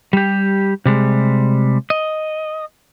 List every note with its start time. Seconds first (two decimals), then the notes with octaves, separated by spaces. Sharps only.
0.13 G3 G4
0.86 C3 G3 G#3
1.90 D#5